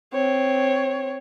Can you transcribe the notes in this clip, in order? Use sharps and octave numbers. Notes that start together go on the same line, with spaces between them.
C4 C#5